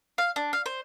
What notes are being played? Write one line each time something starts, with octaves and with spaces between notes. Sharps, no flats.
F5
D4
F5
C5